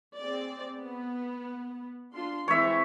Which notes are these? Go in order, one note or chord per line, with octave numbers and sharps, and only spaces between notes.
C4 G#4 D5
B3
D4 F4 C6
E3 G#3 C4 C#5 E5